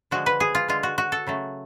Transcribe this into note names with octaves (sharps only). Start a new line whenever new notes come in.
D3 F3 G#3 F#4
B4
G#4
F4
D3 G#3 F4
F#4
F#4
A4
C#3 F#3 A3